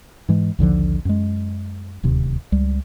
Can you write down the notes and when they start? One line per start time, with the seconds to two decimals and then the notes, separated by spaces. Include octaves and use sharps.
0.29 G#2 E3 G#3
0.59 A#1 D#2 D3 F3
1.05 F#2 G#3
2.03 D1 D#2 C3
2.52 C#2 G3